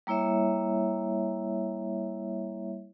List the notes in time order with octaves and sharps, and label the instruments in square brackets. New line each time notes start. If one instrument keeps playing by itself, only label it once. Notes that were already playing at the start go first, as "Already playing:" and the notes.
[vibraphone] G3 A#3 E4 C#5 E5